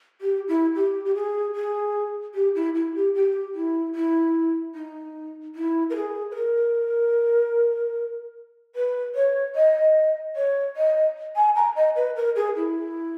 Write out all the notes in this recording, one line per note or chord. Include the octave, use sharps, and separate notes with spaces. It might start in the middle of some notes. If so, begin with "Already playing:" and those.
G4
E4
G4
G4
G#4
G#4
G4
E4
E4
G4
G4
E4
E4
D#4
E4
A#4
G#4
B4
A#4
B4
C#5
D#5
C#5
D#5
G#5
A#5
D#5
B4
A#4
G#4
E4